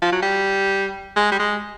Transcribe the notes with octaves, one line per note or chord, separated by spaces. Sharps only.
F3
F#3
G3
G#3
G3
G#3